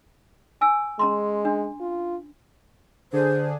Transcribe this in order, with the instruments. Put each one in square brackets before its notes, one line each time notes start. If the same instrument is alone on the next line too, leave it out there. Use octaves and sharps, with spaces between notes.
[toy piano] G#5 E6
[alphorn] G#3 [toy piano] C#4 A#5 C6
[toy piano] D4
[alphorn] F4
[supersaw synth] D3 D4 G#4 [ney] C5